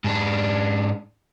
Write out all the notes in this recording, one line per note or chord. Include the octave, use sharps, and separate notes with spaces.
G#2 D4